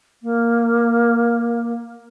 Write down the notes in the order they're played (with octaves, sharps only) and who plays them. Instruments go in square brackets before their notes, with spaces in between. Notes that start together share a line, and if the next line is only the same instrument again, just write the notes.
[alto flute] A#3